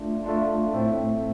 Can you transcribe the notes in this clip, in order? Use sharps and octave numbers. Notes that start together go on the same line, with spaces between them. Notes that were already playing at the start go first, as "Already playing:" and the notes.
Already playing: A3 D4 F4
A3 D4 F4
A2 A3 C4